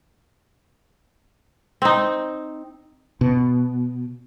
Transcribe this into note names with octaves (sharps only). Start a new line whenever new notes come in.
C4 D#4
B2